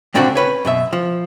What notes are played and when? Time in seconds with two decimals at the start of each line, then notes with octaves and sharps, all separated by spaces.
0.14 G2 A#2 D3 C4 D4 F#4
0.35 C#4 B4 C#5
0.65 F#2 B2 E5
0.93 F3